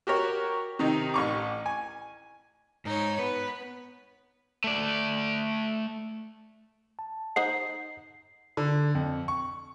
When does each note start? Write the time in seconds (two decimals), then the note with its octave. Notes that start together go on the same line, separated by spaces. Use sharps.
0.07 F#4 G4 A#4 C#5
0.79 C3 D#3 D#4
1.14 A1 C#6 D6
1.66 G#5
2.85 G#2 D#4 C#5
3.19 B3 B4
4.64 A3 D5
6.99 A5
7.36 D#4 C5 F#5 C7
8.57 D3
8.95 F2
9.28 C#6